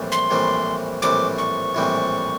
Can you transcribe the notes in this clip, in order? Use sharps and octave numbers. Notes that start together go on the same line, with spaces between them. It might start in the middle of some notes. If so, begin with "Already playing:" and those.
Already playing: A#1 A2 E3 G3 C4
C6
A#1 A2 E3 G3 C4
A#1 A2 E3 G3 C4 D6
C#6
A#1 A2 E3 G3 C4